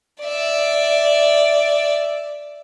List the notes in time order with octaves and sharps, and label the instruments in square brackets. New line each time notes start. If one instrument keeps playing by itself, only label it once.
[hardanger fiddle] D5 E5